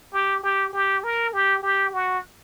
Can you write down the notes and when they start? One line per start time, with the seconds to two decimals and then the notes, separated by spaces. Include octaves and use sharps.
0.13 G4
0.43 G4
0.73 G4
1.04 A#4
1.33 G4
1.63 G4
1.93 F#4